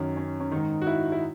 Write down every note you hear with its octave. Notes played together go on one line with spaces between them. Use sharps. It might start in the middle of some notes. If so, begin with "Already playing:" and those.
Already playing: F#2 D#3 C#4
C#4
C#4
G#2 D#3 D#4
F#4
E4
E4